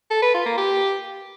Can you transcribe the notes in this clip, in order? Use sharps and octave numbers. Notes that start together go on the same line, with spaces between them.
A4
B4
F4
A#3
G4